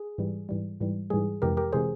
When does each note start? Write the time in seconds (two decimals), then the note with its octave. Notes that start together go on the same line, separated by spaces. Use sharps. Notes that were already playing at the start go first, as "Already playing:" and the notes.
Already playing: G#4
0.18 G#2 E3 G3
0.49 G#2 E3 G3
0.81 G#2 E3 G3
1.10 G#2 E3 G3 G#4
1.42 F2 C3 E3 G#3 G4 A#4
1.57 G4 A#4
1.73 C3 E3 G#3 G#4 C5